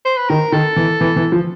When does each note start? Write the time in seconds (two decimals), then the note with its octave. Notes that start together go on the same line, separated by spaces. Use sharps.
0.05 C5
0.17 B4
0.30 D#3 A#4
0.52 D#3 A4
0.76 E3
1.01 E3
1.16 E3
1.32 F3